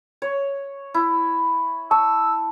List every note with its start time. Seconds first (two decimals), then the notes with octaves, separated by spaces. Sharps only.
0.22 C#5
0.94 E4
1.91 A5 C#6 E6